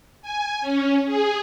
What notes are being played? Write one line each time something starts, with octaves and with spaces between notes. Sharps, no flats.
G#5
C#4
G#4